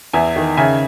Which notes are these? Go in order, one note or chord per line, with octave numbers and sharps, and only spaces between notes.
E2 E5 G#5
D#3
C#3 E5 G#5